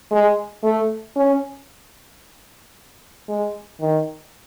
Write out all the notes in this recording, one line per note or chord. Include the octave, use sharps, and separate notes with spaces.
G#3
A3
C#4
G#3
D#3